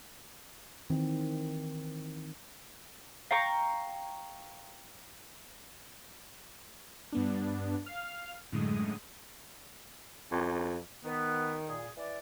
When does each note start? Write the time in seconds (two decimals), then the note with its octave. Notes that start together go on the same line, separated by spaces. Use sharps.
0.90 D#3 E3 C4
3.31 F5 G5 A#5 C#6
7.12 G2 B3 D4
7.86 F5 F6
8.52 F#2 A2 D3 G#3 D#6
10.31 F2
11.04 D#3 B3
11.68 A#2 G#4
11.97 E3 B4 D5